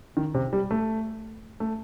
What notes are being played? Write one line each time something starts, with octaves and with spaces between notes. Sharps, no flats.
D#3
C3
G3
A3
A3